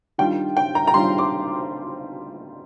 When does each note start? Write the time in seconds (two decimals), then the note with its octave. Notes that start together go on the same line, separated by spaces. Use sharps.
0.18 D#3 G3 D4 F4 G5
0.57 G5
0.75 A#5
0.87 A#5
0.93 D#3 G3 D4 F4 C6
1.18 D6